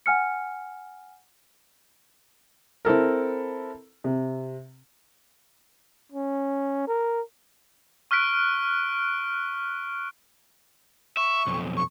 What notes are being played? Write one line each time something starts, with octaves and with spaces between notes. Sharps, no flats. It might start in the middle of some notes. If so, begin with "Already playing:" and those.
F#5 G#5 F6 C#7
C4 E4 A4 A#4
C3
C#4
A#4
C#6 F6 F#6 B6 D7
E5 C#6
B1 F2
C#6